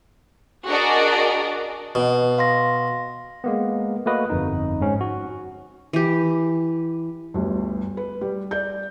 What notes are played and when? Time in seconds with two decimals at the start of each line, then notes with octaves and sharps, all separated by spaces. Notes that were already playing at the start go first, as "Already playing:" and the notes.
0.67 D4 F#4 G#4 A#4 D5 D#5
1.95 B2 D#5 F#5
2.38 F5 C6 A#6
3.44 G#3 A#3 B3
4.06 A3 A#3 F#4 B4 D#5
4.30 G1 F2 D#4
4.81 G#2 C#4
5.01 F#4
5.93 E3 G4
7.34 G1 D2 G2
7.97 B4
8.21 G3
8.51 D5 G6